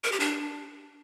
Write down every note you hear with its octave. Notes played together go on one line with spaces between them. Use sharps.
A#4
G4
D4